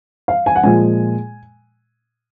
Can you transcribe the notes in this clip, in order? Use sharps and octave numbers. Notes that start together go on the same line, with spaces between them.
F5
G#5
F#5
A#2 F3 G#3 G#5